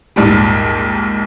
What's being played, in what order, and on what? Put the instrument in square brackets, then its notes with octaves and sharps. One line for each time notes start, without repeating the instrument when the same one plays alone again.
[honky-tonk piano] A#1 D#2 G#2 G3